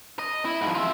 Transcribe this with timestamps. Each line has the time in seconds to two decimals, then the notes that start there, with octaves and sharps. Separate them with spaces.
0.19 D#5
0.45 E4
0.61 G#2 F3
0.75 F4 E5